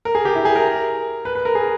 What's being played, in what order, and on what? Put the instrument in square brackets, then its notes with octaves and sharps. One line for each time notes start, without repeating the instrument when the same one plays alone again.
[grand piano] A#4
G#4
G4
E4
G#4
A#4
B4
B4
A#4
G#4